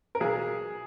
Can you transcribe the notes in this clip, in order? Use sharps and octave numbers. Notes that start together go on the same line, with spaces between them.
A#4
B1 G#4